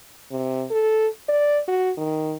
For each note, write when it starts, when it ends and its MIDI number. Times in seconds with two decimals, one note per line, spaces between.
0.32 0.64 48
0.71 1.08 69
1.29 1.60 74
1.68 1.91 66
1.97 2.36 51